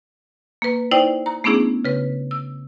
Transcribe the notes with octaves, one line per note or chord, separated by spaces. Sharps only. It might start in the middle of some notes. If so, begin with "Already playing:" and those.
A#3 B4
D#4 E4 C5 D5 G5
A#5
A3 B3 C#4 D4 E4 G#4
C#3 B4
E6